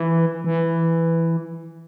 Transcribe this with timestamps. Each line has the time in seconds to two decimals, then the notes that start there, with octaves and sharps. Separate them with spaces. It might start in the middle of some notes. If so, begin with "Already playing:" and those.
Already playing: E3
0.44 E3